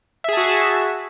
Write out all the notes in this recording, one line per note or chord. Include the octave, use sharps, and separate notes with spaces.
F#4 G#4 E5 A5